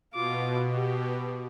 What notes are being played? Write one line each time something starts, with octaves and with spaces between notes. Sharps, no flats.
B2 F4 D6
G4